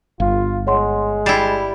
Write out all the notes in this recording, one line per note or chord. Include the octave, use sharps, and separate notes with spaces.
G1 F4 F5
G#3 C#5 F#5 C6
G3 E4 A6 C7 E7